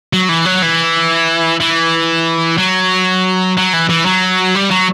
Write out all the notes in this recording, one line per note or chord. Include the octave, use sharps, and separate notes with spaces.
F#3
E3
F#3
E3
E3
F#3
F#3
E3
E3
F#3
G3
F#3